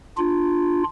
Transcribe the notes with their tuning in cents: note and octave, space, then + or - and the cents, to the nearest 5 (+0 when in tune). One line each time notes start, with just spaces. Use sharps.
D4 +15 F4 +0